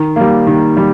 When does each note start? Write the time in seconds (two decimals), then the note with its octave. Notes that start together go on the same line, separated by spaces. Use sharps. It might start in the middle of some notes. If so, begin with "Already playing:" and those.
Already playing: D#3
0.16 G3 A#3
0.47 D#3
0.77 G3